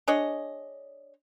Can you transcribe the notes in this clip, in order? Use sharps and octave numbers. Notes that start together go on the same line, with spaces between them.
D4 G#4 C#5 D#5